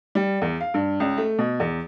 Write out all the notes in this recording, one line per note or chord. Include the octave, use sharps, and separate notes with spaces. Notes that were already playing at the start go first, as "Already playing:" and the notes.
G3
E2
F5
G2
C#2
A3
B2
E2